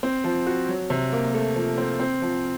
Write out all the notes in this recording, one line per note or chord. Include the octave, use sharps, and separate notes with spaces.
C4
F3
F#4
F#3
C3
A#3
A3
F3
C4
C4
F3